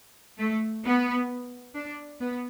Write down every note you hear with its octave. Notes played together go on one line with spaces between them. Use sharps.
A3
B3
D4
B3